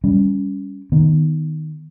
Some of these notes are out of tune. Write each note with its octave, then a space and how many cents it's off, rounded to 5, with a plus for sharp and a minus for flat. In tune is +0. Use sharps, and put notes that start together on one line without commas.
G3 +5 C#4 +15
D#3 +0 B3 -5